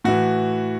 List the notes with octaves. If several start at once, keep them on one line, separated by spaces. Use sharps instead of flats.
A2 E3 F#4